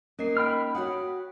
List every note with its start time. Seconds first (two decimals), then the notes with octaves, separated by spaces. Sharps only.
0.19 A#3 C#4 D#4 D#5 C7
0.37 G5 B5 F6
0.75 F#4 C#5 F#5 D#6 F#6